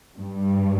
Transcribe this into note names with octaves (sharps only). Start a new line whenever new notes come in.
G2